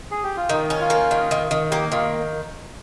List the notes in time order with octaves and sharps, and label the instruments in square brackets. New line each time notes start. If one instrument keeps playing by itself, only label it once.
[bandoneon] G#4
G4
F4
[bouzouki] D#3 [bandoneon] D#4
[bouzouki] C#4
[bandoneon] F4
[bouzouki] A#3
D#3
D#3
D#3
[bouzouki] A#3 [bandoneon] G4
[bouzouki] D#3 [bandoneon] F4